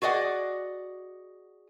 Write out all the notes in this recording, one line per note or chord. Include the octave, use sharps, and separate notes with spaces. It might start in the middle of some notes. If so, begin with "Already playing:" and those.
F#4 G#4 D5 D#5 F#5